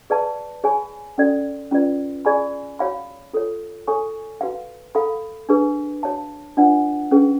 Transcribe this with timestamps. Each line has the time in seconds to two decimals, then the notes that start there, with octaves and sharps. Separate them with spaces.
0.10 G#4 B4 D5 F5 A5
0.64 G#4 C#5 G#5 B5
1.18 C#4 F#4 A4 D5
1.71 C#4 F4 B4 D5
2.25 G#4 D5 G#5 B5
2.79 F#4 C#5 F5 B5
3.33 F4 A4 C#5
3.87 A4 C#5 G#5 C#6
4.41 F#4 B4 F5
4.95 A4 F5 B5
5.49 D4 G#4 B4
6.03 F#4 C#5 F5 A5
6.57 D4 F4 B4 D5 F#5
7.11 C#4 G#4 B4